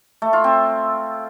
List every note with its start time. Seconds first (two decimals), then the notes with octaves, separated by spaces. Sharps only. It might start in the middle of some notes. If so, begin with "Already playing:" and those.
0.22 A3
0.33 F4
0.44 C4